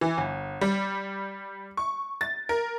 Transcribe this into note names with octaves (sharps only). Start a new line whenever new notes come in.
E3
G1
G3
C#6
A6
A#4